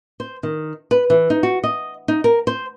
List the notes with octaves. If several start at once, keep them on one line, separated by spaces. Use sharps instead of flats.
C5
D#3
B4
E3
D#4
F#4
D#5
D#4
A#4
C5